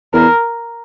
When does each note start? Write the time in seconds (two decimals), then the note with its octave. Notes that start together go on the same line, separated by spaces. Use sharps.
0.13 E2 A#4